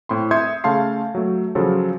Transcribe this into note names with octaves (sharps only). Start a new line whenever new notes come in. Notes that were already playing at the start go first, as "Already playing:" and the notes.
A2 C4 B5 C6
E5 C6 D#6 G6 G#6 C#7
C#3 A3 F5 A5 C6 C7
F#3 A3
C#3 F3 F#3 F4 A4